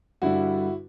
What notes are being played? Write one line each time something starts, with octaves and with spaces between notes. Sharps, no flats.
G2 D3 G3 E4 F#4